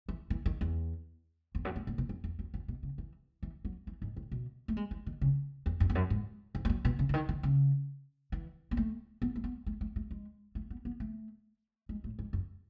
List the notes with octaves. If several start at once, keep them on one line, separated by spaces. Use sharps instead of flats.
E3
E3
D#3
E2
E2
F#2
G#2
A2
B2
F#2
E2
F#2
F#2
B2
C#3
E3
E3
F#3
E3
G#2
A2
B2
A3
G#3
E3
D#3
C#3
E2
F#2
E2
F#2
G#2
G#2
G#3
F#3
B2
C#3
C#3
D#3
D#3
C#3
E3
B3
A3
B3
A3
B3
A3
A3
A3
G#3
A3
B3
B3
A3
G#3
A2
G#2
F#2